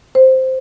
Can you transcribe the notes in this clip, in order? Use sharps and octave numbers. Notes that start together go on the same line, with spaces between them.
C5